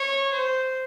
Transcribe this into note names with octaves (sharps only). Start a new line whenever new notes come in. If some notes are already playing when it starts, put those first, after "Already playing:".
Already playing: C#5
C5